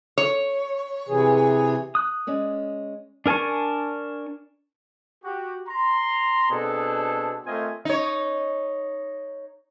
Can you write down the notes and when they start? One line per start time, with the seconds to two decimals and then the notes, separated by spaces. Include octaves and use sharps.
0.18 C#5
1.09 C3 E3 G#4
1.95 D#6 F#6
2.27 G#3 C#4 D5
3.26 D4 A#4 G#5 A5 C#6
5.24 F#4 G4
5.68 A#5 C6
6.51 B2 C4 D4 G#4 A4
7.46 A3 C4 F4 A#4 D#5 G#5
7.85 D#4 C#5